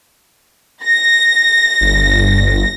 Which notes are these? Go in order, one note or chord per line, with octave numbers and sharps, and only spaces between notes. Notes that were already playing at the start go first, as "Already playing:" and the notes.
A#6
G1